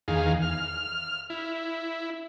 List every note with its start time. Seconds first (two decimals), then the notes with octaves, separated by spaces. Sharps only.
0.08 E2 D#3 G#4 F5
0.42 F6
1.30 E4